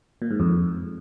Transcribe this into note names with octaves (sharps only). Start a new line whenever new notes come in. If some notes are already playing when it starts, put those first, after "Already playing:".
A#2
G#2
F2